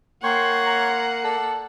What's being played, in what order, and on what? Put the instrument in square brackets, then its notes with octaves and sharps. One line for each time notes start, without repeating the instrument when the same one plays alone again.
[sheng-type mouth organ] A#3 [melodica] C#5 C6 C#6 [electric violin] F#5 [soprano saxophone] G5
[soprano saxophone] A#5
[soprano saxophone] A4 [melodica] D5